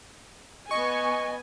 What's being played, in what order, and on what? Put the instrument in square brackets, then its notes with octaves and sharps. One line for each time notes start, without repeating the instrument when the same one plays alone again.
[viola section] B3 G#5 [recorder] D#5 [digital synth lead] C#6